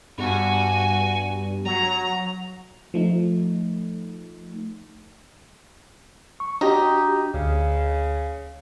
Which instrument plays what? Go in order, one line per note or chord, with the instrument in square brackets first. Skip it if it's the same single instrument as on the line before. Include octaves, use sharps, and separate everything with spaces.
[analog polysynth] G2 [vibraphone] B3 [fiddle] F#4 G#5
[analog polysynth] F#3 [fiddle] A#5
[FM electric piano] F3 A3 D#4
[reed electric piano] C#6
[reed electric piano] D4 F#4 G5 [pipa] D#4 [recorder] G4
[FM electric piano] D2 [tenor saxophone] C#3